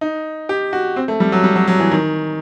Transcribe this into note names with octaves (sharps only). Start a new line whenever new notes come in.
D#4
G4
F#4
C4
A3
G3
F#3
G3
F#3
F#3
E3
D#3